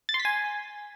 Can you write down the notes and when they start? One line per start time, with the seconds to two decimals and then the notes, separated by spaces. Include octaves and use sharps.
0.09 A6
0.14 C6
0.20 B6
0.25 G#5